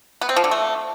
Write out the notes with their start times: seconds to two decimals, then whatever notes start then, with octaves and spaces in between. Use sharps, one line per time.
0.21 B3
0.29 C4
0.36 F3
0.44 D3
0.51 A3